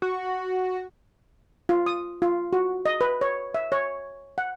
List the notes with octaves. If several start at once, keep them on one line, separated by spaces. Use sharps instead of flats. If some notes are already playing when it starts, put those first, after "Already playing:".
F#4
F4
D#6
F4
F#4
D#5
B4
C#5
E5
C#5
F#5